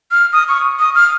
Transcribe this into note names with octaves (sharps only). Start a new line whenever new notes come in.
F6
D#6
C#6
D#6
F6